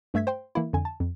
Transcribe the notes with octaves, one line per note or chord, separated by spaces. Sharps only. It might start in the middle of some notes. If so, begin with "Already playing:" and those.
G2 A3 E5 G#6 B6
C5 G5 C6
E3 A#3 E4
F2 D3 G#5
A5
F2